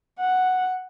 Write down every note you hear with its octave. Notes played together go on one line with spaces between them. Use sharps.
F#5